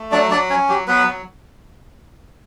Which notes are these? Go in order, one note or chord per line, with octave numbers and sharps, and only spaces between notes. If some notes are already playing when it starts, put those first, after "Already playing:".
Already playing: A3
F#3 D4 D5
F#3 D4 D5
C#4 C#5
F#3 G4
F#3 B3 B4
F#3